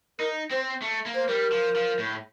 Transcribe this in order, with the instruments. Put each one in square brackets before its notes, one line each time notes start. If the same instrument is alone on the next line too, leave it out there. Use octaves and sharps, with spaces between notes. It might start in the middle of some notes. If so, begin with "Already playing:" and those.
[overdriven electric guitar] D#4 [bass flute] A#4
[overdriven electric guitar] C4 [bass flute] C5
[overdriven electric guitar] A3
A#3
[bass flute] C5
[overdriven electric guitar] G3 [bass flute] A#4
[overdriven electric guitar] F3
F3
A2